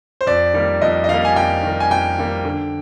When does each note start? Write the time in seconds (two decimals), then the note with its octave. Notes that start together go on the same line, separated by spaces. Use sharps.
0.21 C5
0.27 F2 D5
0.54 D#3 G3 A#3
0.82 F2 D#5
1.04 D#5
1.09 D#3 G3 A#3 F5
1.25 G#5
1.36 F2 G5
1.63 D#3 G3 A#3
1.80 G#5
1.91 F2 G5
2.18 D#3 G3 A#3
2.45 D3